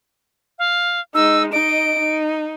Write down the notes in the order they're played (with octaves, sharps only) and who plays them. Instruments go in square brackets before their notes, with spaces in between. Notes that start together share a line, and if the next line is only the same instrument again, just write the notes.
[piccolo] F5
[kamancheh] G#3 D#4 [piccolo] E6
[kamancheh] D#4 D#5 [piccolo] D7
[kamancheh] D#4